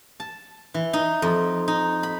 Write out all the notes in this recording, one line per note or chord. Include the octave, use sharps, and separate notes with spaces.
A5
E3
D#4
F2
D#4
B5